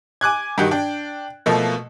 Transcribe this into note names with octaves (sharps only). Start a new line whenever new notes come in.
G#5 D6 F#6 G#6
G2 D#3 F#4 G4
D4 G5
B2 F3 A3 A#3